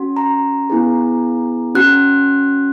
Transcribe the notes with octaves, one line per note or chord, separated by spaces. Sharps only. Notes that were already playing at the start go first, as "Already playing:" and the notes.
Already playing: C#4 F#4
A#5
B3 E4 G#4
C#4 F#4 F#6